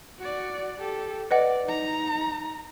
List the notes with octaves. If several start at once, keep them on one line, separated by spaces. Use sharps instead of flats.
F#4 D5
G4 A4
B4 D5 D#5 F#5
D#4 A#5